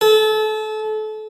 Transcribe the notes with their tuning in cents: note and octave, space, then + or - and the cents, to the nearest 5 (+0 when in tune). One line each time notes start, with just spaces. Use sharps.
A4 -30